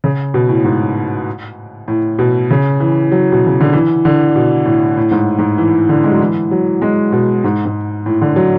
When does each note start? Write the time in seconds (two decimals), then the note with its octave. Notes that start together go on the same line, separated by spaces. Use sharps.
0.04 C#3
0.34 B2
0.49 A2
0.64 G#2
1.88 A2
2.19 B2
2.50 C#3
2.80 E3
3.12 F#3
3.32 B2
3.47 C#3
3.61 D3
3.73 E3
4.05 D3
4.36 B2
4.66 A2
4.97 A2
5.11 G#2
5.39 G#2
5.58 E3
5.89 D3
6.04 G#3
6.11 F#3
6.21 E3
6.51 F#3
6.82 G#3
7.12 B2
7.44 G#2
7.65 G#2
8.06 A2
8.22 D3
8.36 F#3